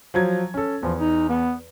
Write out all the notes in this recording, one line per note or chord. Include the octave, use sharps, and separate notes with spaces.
F3 F#3 G#6
C#4 A4
E2 F3
D#4
B3